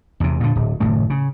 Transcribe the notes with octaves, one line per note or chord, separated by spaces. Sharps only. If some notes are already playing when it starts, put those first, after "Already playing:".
E2 C3
A#2 D3
D1
F#1 A2 D#3 A3
C#3